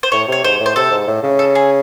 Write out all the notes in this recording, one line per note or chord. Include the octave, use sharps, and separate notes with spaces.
C5
A2 C#5
C3 C#5
G#2 C5
A2
C5
C3 A4
G#2
A2
C#3
A4
G#4